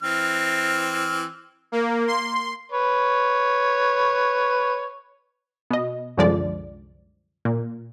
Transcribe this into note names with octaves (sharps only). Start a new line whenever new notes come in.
E3 C4 F6
A#3
C6
B4 C#5
B2 D#5
C2 F#2 D3 F3 G#3 D5
A#2